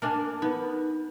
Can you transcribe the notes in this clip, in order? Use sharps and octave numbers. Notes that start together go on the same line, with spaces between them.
A#3 D4 G#5
B3 D#4